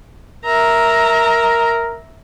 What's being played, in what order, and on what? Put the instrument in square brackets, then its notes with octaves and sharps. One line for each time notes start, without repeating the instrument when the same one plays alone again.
[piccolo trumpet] A#4 [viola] E5 A#5